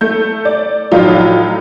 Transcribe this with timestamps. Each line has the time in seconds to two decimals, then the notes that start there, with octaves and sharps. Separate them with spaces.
0.01 A3 G6
0.45 D5
0.92 A2 F3 F#3 D#4 F4